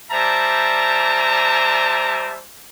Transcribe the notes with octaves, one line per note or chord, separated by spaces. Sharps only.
G3 C5 D5 E5 A5 A#5